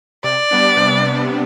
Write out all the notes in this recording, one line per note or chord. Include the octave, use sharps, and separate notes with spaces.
C3 D5
G3 B3 D4
C3
G3 B3 D4
C3